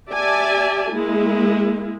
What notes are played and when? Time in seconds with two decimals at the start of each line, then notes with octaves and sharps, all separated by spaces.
0.12 G4 D5 E5 G#5 A5
0.90 G#3 A#3 E4